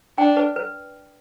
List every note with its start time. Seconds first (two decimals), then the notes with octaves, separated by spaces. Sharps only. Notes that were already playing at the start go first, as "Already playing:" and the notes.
0.18 D4 G5
0.37 B4
0.56 B4